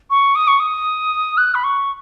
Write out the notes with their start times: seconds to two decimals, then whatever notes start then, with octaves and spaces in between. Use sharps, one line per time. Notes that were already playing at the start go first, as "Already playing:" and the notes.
0.10 C#6
0.35 D#6
0.48 C#6
0.60 D#6
1.37 F#6
1.55 B5
1.64 C#6